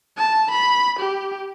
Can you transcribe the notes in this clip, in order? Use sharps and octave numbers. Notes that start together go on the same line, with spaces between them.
A5
B5
G4